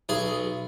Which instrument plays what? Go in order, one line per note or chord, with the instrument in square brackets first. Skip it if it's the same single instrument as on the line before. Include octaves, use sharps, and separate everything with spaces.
[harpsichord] B1 G#4